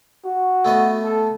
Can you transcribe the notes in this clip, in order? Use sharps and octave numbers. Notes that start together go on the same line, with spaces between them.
F#4
A3 B3 D#5
A4